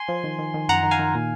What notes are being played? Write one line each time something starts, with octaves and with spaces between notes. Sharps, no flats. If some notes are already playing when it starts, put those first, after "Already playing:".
Already playing: G#5 C6
F3
D#3
D#3
D#3
F#2 F#5 A#5
D#3
F5 G#5
D#3
A#2